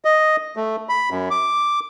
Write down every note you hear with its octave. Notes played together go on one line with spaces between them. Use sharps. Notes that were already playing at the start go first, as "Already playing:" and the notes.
D#5
A3
B5
F#2
D6